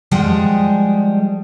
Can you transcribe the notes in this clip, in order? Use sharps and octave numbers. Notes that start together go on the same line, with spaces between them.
F3 G3 G#3 G#4 F#5 G5